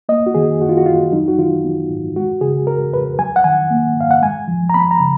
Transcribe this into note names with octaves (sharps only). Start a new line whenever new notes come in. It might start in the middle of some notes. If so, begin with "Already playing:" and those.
A#3 D#5
F#4
D#3 G#4
F#2 F#4
F4
F#4
F#2 F4
F#3 D#4
F#4
D#3 F4
B3
G#2
G#3 F#4
C#3 G#4
F2 A#4
F2 B4
F#3 G#5
F#5
D#3 G#5
A#3
G#2 F5
F#5
G#3 G#5
F3
A#5
B3 B5
A#5
C#3